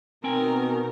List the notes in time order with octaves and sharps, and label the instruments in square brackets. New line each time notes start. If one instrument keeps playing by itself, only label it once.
[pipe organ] B2 [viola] D#3 A#4 [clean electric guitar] C4 G5 G#5